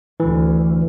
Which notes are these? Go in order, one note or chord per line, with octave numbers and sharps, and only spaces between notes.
D2 E3